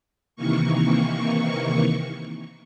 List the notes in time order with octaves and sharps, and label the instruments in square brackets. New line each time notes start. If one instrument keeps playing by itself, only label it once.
[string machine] C3 D#3 E3 A#3 C#6